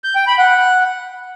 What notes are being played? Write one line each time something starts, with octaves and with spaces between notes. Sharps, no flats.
G6
G5
B5
F#5